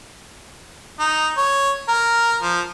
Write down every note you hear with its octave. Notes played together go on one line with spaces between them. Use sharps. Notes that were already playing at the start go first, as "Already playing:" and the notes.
D#4
C#5
A#4
F3